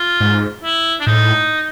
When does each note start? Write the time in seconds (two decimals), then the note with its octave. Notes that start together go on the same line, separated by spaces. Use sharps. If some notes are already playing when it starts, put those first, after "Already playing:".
Already playing: F4
0.20 G#2
0.63 E4
1.00 D4
1.07 A2 D#4